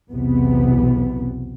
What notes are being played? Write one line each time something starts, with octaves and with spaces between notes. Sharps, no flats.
B1 E2 C3 B3